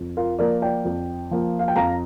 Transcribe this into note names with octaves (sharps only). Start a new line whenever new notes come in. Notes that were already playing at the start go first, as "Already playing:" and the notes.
Already playing: F2
F4 A#4
F3 A#3 A#4 D5
D5 G5
F2
F3 A#3
F5
G5
F2 F5 A#5